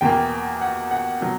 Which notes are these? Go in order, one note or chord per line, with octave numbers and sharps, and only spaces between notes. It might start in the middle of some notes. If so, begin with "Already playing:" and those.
E2 B2 A#3 G5
F#5
F#5
B2 F#3